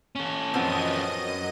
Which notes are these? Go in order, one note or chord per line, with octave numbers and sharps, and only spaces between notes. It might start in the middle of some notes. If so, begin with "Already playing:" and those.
C#4 A4
F#2 F3 B3 C4 D#5 D#7